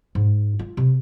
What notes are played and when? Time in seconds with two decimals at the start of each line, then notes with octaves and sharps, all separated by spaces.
0.15 G#2
0.59 F4
0.77 C3